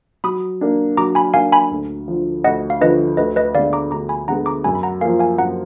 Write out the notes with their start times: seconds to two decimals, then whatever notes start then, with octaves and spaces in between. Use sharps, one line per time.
0.24 F#3 B5 D#6
0.61 A#3 D4
0.97 F#3 A#5 D6
1.15 G#5 B5
1.34 A#3 D4 F5 G#5
1.52 G#5 B5
1.71 D2
2.08 D3 F3
2.44 D2 D#5 F#5
2.70 F5
2.81 D3 F3 B4 D#5
3.17 D2 B4 D#5
3.36 B4 D#5
3.54 D3 G#3 B3 D5 F5
3.73 A#5 D6
3.91 D2 A#5 D6
4.09 G#5 B5
4.28 D3 G#3 B3 F#5 A#5
4.46 A#5 D6
4.64 F#2 G#5 B5
4.75 B5
4.83 F#5 A#5
5.01 F3 A#3 F5 G#5
5.19 F5 G#5
5.38 F#2 F#5 A#5